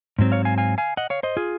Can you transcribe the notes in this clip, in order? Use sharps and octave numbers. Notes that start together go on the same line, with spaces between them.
G#2 F#3 C4
C#5 F5
F5 G#5
F5 G#5
F5 G#5
D#5 F#5
C#5 F5
C5 D#5
F4 G#4